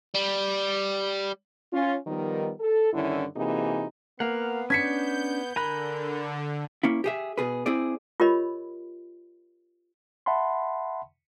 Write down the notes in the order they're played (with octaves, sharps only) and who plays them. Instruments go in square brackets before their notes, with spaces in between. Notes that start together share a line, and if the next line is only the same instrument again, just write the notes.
[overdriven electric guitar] G3
[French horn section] C#4 F4
D#3 F3 G3 B3 D#4 A#4
A4
G2 D3 D#3 C#4 E4
C3 E3 A#3 D#4 F#4 G#4
[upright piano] A#3 [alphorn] B3 [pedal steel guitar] F5 F#5
[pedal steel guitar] C#4 D4 [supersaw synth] G6 [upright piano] G#6 B6 C#7
[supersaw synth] D3 [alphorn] A#4 [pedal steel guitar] G#5 A#5 F#6 [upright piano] B5
[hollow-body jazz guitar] A#3 C#4 E4
G4 G#4 E5
B2 G#4 B4
C4 E4 G#4 D5
[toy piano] F4 G4 A#4 C#5 D#5 B5
[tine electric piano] E5 F#5 A5 B5 C6